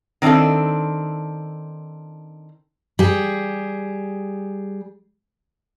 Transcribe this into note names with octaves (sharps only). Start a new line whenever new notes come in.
D#3 C4 D4 E4 A4
G3 G#4